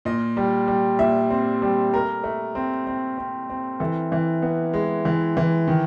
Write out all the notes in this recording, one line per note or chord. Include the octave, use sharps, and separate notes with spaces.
A#2 D#5
G3
G3
A#2 E5
C4
G3
A3 A#4
A3
C4
C4
C4
C4
E3 A4
E3
B3
G#3
E3
E3
D#3